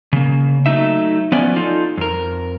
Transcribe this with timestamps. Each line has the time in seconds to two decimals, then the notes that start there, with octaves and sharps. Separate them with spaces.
0.13 C#3 A#3
0.66 F#3 A3 D#4 E5
1.32 F3 B3 C#4 D5 G#5
1.56 D#4 F4 A4
1.98 F2 A#4